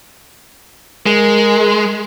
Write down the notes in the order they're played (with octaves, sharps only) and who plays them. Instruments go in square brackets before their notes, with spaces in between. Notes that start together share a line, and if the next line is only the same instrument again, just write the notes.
[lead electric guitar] G#3 [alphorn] A#4